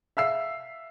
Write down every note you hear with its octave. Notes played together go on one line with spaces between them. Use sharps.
E5 F5 E6 C7